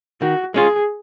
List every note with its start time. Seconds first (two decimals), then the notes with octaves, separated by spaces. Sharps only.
0.21 D#3 F#4
0.54 G#3 C#4 F4 G#4